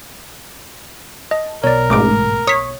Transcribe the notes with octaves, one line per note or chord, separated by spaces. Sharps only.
D#5 A5
B1 B2 A#4 C#5 D5
A1 G#2 A3 D6 D7
C#5 D#6 B6